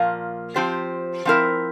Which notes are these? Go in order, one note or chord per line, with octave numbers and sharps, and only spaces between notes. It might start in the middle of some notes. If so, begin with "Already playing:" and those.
Already playing: A#2 F3 A#3
F3 C4 G4 C5
F3 C4 E4 A#4